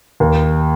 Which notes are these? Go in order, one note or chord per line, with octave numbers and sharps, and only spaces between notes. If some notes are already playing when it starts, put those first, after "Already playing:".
D#2